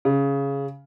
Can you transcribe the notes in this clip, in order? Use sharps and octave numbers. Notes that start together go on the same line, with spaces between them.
C#3